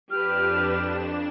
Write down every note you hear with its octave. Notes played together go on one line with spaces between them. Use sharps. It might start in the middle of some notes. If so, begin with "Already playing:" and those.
F2 D4 G4 B4 F6 E7